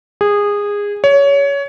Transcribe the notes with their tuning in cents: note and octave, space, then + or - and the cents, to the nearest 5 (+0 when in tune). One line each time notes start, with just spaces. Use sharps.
G#4 -20
C#5 +20